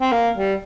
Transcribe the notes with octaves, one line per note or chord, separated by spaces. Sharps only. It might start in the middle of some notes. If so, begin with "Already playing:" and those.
C4
A#3
G3